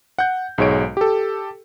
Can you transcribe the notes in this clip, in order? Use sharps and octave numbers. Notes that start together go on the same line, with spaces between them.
F#5 G6
B1 G#2 G#3 C#5 D7
G4 A4